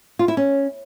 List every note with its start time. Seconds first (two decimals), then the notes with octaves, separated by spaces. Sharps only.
0.19 F4
0.28 E4
0.37 C#4